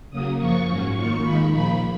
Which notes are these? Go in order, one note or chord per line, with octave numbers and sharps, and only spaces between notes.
C#3 F#3 A#3 D#6
F#2 F3 A#3 C#6
G#2 F#3 C#4
D#3 A#3 F4 C#6
D#2 D#3 G#3 B5
A#2 F3 A#3 B5